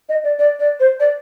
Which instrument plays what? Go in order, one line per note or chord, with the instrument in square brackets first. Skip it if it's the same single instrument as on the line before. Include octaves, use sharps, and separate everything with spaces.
[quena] D#5
D5
D5
D5
C5
D5